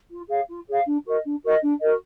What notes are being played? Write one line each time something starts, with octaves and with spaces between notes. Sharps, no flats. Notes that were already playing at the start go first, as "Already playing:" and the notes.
F4
G#4 C#5 F5
F4
G#4 C#5 F5
D4
F#4 A#4 D#5
D4
F#4 A#4 D#5
D4
F#4 A#4 D#5